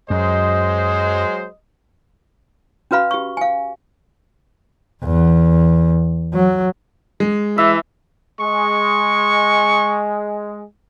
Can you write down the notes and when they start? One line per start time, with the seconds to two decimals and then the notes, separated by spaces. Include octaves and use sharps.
0.10 F#2 F#3 G#3 C5 D#5
2.91 C#4 F#4 B4 F5 B5
3.11 G4 C#6
3.37 F5 G#5
5.04 E2
6.34 F#3
7.20 G#3
7.58 E3 E5
8.40 G#3 C#6